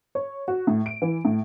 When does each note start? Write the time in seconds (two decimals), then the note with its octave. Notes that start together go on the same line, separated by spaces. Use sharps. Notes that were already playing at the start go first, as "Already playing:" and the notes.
0.15 C#5
0.48 F#4
0.67 A2
0.86 D7
1.02 E3
1.25 A2